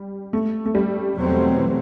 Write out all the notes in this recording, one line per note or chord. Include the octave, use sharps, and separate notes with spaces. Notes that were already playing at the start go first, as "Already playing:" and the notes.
Already playing: G3
A3
A3
G3
E2 B2 F#3 A3 C4
E3